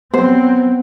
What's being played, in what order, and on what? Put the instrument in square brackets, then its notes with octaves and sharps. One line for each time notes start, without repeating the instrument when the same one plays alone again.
[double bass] F#3 C4 [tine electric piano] B3 [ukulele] C5